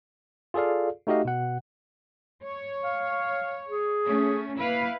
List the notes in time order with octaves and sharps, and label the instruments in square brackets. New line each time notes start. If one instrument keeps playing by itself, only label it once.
[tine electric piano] F4 G#4 A4 D5 F5
A3 D#4 F#4 G4 D#5 F5
B2 F#5
[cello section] C#5
[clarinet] F5
G#4
[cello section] A3 C#4
[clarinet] A#3 [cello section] E4 B4 F5